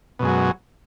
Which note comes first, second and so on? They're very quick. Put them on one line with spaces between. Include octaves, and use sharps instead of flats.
B2 F#2 G#3 F#3